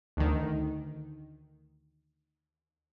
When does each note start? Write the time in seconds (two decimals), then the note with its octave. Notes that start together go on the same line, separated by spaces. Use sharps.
0.17 D2 D#3